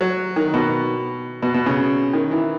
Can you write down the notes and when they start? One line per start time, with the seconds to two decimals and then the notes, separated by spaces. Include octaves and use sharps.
0.01 F#3
0.36 D#3
0.54 B2
1.42 B2
1.54 B2
1.66 C#3
2.13 D#3
2.31 E3